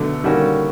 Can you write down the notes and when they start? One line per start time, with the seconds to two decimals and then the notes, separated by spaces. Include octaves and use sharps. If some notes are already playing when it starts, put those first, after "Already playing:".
Already playing: B2 D3 F#3 A3
0.24 D#3 G3 A#3 C#4 F#4